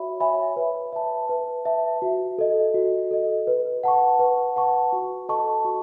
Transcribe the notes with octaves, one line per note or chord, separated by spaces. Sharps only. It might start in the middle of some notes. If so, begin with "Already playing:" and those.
Already playing: F#4 C#5 E5 B5
C#5 E5 G#5 B5
B4
E5 A5
B4
E5 A5
F#4
A4 D#5
F#4
A4 D#5
B4
F#5 A5 C#6
B4
F#5 A5 C#6
F#4
A4 D#5 A5 C#6
F#4